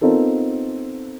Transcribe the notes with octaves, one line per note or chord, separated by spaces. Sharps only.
B3 C4 D#4 F4 A4 A#4